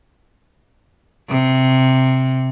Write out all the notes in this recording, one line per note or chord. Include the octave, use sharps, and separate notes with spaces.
C3